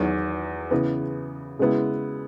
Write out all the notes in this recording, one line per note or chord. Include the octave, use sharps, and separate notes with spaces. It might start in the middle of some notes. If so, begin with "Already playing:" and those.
Already playing: E2 D#3 F#3
C#3 E3 B3
C#3 G#3 B3 E4